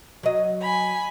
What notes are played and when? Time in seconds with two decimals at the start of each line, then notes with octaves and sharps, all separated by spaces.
0.23 F#3 D#5
0.61 G#5 B5